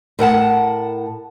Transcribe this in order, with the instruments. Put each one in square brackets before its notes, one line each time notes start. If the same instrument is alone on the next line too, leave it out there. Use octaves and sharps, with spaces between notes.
[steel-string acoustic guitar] A2 A#4 F#5 A5